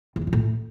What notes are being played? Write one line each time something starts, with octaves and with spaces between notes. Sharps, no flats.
E2
G#2
F3
A2